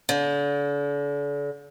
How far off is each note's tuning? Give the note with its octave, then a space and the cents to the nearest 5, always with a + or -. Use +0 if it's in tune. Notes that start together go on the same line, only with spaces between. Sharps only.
D3 -40